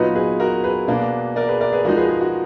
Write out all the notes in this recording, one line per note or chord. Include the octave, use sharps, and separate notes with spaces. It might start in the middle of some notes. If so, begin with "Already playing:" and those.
Already playing: A#2 F#3 B3 D#4 B4 D#5
G#4 B4
F#4 A#4
G#4 B4
B2 A#3 D4
A#4 D5
G#4 B4
A#4 D5
G#4 B4
F3 G#3 D#4 F#4 A#4
G#4 B4
G#4
F#4